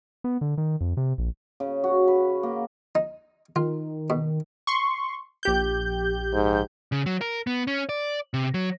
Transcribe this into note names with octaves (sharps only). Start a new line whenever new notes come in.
B3
D3
D#3
F2
C3
A#1
C#3
F#4
B4
A#3
D#4
D#3 F4
B2
C6 C#6
A#1 G4 G6
G#2
C#3
F#3
A#4
B3
C#4
D5
C3
F#3